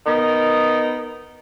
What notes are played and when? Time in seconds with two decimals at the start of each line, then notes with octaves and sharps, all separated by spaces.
0.06 B3 D#4 A#4